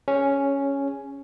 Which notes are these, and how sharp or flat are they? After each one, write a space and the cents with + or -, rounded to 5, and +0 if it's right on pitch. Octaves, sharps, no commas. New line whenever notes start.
C#4 +0 G#4 -15